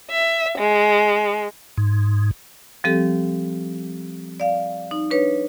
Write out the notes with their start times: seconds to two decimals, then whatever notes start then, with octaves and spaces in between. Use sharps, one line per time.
0.10 E5
0.57 G#3
1.78 G#2
2.84 F3 G3 C4 G4 A4
4.40 D5 F5
4.91 D#4
5.11 D4 B4 C#5